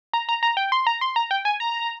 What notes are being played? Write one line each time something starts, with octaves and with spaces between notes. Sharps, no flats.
A#5
A#5
A#5
G5
C6
A#5
C6
A#5
G5
G#5
A#5